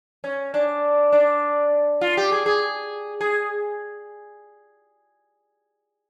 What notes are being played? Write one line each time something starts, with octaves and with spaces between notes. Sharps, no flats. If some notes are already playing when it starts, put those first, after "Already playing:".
C#4
D4
D4
F4
G4
G#4
G#4
G#4